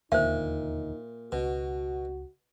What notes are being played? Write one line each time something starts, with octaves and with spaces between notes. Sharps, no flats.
E1 D#2 A#2 D3 D#4 C5 E5
C#2 B2 F#4